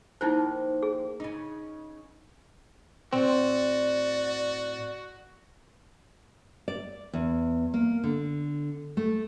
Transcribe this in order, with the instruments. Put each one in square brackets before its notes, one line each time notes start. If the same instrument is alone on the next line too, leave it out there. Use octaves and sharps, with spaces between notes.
[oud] D#3 F3 A#3 [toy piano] D#4 E4 C5
[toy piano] G#4
[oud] C#3 D#4
[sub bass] A2 [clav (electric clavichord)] C4 [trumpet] F#4 [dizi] D5
[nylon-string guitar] D5
E2
A#3
D3
A3